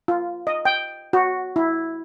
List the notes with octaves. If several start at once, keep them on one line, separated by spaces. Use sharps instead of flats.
F4
D#5
G5
F#4
E4